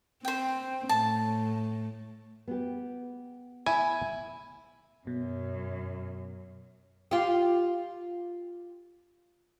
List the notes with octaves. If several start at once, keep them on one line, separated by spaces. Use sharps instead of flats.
C4 C5 G5
A2 A5
B3 G4
E4 G#5
F#2 B2
F4 G4